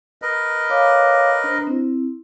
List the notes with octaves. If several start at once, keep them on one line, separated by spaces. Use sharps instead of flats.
A#4 B4 D#5
C#5 F5 D6
D4 C5
C4 E4